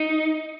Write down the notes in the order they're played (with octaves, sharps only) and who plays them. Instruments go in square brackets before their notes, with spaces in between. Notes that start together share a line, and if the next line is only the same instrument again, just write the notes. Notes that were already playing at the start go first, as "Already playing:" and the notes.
Already playing: [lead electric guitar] D#4